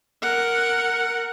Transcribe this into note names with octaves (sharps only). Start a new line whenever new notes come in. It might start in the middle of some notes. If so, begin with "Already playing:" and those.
A#4 F#5